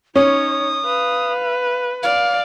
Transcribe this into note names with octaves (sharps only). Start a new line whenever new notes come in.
C#4 D#4 C#5 D#6
B4 F5
D5 F5